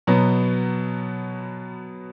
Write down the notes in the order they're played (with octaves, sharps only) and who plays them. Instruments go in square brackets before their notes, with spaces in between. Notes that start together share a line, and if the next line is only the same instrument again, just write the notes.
[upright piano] B2 F#3 B3